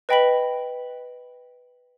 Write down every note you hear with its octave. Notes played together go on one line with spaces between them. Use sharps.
B4 D#5 G5 B5 B6 F#7